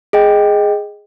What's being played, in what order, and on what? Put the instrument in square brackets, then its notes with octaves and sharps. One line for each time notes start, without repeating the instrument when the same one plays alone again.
[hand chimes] G#4 D#5 G5